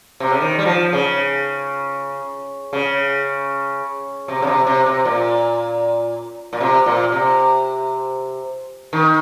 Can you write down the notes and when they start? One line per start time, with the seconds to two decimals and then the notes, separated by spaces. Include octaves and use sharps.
0.20 C3
0.31 C#3
0.41 D#3
0.58 G3
0.66 F3
0.93 C#3
2.73 C#3
4.28 C3
4.42 C#3
4.47 C3
4.67 C3
4.86 C3
5.05 A#2
6.53 A#2
6.60 C3
6.86 A#2
7.12 C3
8.93 D#3